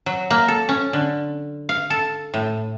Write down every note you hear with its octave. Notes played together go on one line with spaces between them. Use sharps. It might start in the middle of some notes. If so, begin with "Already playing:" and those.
F#3
A#3
A4
C#4
D3
F5
A4
A2